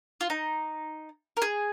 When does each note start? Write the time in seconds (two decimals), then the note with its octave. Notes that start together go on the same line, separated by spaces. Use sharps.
0.21 F4
0.30 D#4
1.37 A#4
1.42 G#4